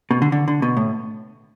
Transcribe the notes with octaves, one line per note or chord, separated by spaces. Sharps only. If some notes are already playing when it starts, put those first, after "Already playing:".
B2
D3
D3
D3
B2
A2